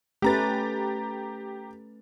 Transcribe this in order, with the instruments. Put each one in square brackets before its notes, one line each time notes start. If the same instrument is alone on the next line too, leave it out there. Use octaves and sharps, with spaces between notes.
[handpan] A3 C#4 B4 [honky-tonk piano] G4 A#5 A6